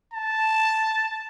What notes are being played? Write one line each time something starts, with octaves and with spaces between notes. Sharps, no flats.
A5